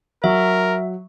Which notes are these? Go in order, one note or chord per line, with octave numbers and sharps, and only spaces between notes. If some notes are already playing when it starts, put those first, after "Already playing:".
F#3 A#4 E5